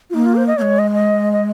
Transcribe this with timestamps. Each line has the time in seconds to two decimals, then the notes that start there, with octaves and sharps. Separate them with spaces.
0.10 F4
0.14 A#3 D#4
0.25 F4
0.35 C5
0.47 D#5
0.57 A#3 C#5
0.62 G#3
0.79 D#5
0.94 D#5
1.33 D#5